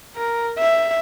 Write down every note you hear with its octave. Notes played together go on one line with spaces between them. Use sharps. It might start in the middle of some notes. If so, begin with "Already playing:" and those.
A#4
E5